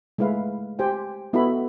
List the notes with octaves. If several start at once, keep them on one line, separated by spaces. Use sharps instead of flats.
G#3 A3 E4 B4 F5
G4 C5 G5 G#5
B3 E4 F#4 A4 D#5 B5